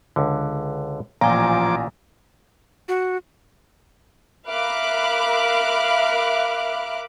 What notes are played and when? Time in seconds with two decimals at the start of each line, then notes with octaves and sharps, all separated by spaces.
0.16 C#2 D3
1.21 A1 A#2 F3 G5 G#5 A#5 D6
2.88 F#4
4.49 A#4 E5 F5 B5 D6 F#6